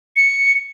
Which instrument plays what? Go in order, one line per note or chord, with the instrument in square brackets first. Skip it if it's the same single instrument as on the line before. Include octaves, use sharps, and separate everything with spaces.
[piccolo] C#7